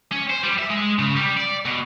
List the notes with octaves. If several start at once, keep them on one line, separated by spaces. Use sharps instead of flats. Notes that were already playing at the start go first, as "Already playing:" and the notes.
C#4
C5
G3
E5
G#3
C#3
G3
D5
B2